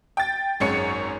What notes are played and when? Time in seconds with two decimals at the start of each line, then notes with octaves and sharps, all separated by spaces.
0.17 G5 A6
0.60 G#1 F#2 G#3 C#5 C#7